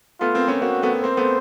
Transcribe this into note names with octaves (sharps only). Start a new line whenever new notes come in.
A3 B3 F4
A#3 C4
B3 C#4
A#3 C4 F#4
A3 B3
A#3 C4 C5
A3 B3